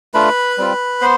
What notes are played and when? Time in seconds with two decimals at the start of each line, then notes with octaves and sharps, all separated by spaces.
0.14 A3 D4 F4 B4 B5
0.58 G3 C4 F4
1.01 B3 C5 C6